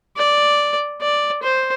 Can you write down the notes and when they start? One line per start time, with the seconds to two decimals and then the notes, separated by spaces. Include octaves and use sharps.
0.17 D5
1.02 D5
1.43 C5